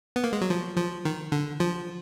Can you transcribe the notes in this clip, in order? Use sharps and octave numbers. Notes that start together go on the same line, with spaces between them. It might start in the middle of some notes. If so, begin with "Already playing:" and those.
B3
A#3
G#3
F#3
F3
F3
D#3
D3
F3